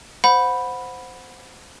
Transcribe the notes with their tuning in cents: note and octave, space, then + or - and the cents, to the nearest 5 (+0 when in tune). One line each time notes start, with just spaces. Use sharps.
C5 -10 F#5 -20 B5 +0